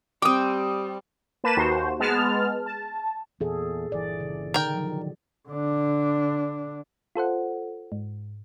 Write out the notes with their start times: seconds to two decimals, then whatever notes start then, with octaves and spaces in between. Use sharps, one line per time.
0.22 G3 C4 G5 D6 D#6
1.44 A#3 B4 A5 E7
1.57 D#2 F#4 C5
2.00 G#3 B3 A5 F6
2.66 A5
3.40 E2 A#2 G#4 A4
3.92 G1 E3 D5
4.20 C#3
4.54 D3 D#3 D#4 A#4 G5
4.74 F3 F#3
5.49 D3 D4
7.15 F4 A4 C5 F#5
7.92 G#2